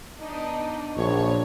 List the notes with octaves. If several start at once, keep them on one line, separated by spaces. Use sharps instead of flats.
B3 D4 D#4
A#1 C#5